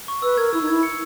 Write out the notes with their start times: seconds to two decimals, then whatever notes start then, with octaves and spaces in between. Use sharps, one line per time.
0.08 C#6
0.22 B4 E6
0.37 A#4 G#6
0.53 E4 E6
0.62 D#4
0.68 E4 G#6
0.83 C#7